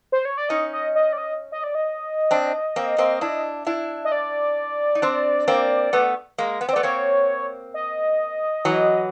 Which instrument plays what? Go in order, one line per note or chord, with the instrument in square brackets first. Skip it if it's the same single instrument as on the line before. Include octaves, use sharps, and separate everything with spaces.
[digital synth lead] C5
C#5
D5
[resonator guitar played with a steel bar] C#4 D#4 [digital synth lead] D#5
[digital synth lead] D#5
D#5
D5
D#5
D#5
D5
D#5
[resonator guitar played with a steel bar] C4 D4
A#3 C4
A#3 C4
D4 E4
D4 E4
[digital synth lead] D#5
D5
[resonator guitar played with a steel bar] D#4
C4 D4
A#3 C4
A3 B3
G#3 A#3
B3
C4
[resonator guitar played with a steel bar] A3 B3 [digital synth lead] D5
[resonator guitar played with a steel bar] A#3 C4 [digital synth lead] C#5
[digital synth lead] D#5
[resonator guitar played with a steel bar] E3 F#3